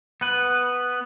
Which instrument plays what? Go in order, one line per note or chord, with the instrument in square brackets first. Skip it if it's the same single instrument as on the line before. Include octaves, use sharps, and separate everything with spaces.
[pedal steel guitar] B3 B4